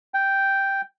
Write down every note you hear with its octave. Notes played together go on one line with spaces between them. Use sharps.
G5